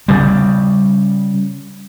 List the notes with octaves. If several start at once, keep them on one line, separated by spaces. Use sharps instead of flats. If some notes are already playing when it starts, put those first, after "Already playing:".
C#3 G3